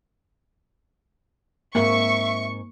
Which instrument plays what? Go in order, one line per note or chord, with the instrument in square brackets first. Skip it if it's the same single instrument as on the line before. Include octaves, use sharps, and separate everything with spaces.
[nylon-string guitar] G#2 C4 A#4 [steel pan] A#3 [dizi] E5 [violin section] C#6